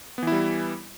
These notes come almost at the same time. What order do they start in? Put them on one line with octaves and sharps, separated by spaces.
B3 E3 E4 G3